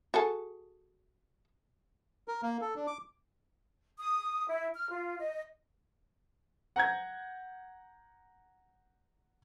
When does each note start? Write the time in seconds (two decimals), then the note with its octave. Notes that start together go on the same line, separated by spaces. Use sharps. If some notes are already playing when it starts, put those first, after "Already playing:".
0.14 F#4 G#4 A4
2.28 A#4
2.43 A#3
2.61 A4
2.76 D4
2.87 D6
3.99 D#6
4.47 E4
4.74 F6
4.89 F4
5.19 D#5
6.76 F#5 A#5 G6 G#6